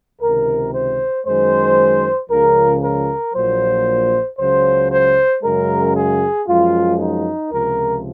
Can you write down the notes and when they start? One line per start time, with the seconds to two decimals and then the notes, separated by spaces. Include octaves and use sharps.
0.21 C#2 C3 D#3 A#4
0.73 C5
1.26 F#2 D#3 G#3 C5
2.29 C#2 C#3 F3 A#4
2.83 A#4
3.34 A#1 A#2 F#3 C5
4.38 C#2 C#3 F#3 C5
4.90 C5
5.43 F#2 C#3 G#3 A#4
5.95 G#4
6.47 F#2 F3 G#3 F4
6.99 D#4
7.51 C#2 C3 F3 A#4